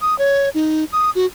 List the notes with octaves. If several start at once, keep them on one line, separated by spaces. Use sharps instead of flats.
D#6
C#5
D#4
D#6
F#4